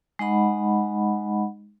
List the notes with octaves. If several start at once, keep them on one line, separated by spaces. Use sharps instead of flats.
G#3 D#4 D#5 F#5 B5